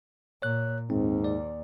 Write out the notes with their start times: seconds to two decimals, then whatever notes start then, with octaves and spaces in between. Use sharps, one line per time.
0.42 A#2 C#5 F#6
0.90 D#2 G#2 C4
1.24 D5